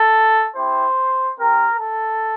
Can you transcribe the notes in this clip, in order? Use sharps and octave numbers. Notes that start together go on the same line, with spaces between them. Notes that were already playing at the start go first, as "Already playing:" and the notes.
Already playing: A4
C4 E4 G4 C5
C4 G4 A#4
A4